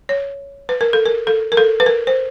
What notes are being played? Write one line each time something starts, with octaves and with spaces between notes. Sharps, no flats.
C#5
B4
A#4
A4
A#4
A4
A#4
A4
B4
A#4
C5